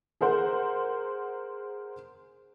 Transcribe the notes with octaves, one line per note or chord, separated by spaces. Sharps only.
G#4 A#4 C5 F#5